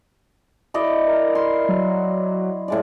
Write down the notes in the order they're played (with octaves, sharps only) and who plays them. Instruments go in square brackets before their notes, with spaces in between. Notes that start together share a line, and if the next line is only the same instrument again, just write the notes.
[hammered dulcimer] E4 D5 D#5
[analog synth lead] A#4
[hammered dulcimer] C6
[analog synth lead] F#3
[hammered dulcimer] A2 G#3 D5